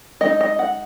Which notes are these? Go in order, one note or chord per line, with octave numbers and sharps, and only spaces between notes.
G#3 D#4 D#5
D#5
F#5